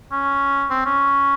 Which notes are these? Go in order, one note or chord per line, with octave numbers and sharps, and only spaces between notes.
C#4
C4
C#4